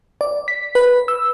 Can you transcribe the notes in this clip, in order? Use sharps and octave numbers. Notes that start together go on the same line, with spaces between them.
D5
B6
B4
E6